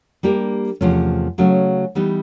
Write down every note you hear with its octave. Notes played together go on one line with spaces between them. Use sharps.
G3 A#3 D4 G4 A#4
E2 C3 F3 A3 C#4
C#3 F#3 A3 C#4
E3 G3 B3 D#4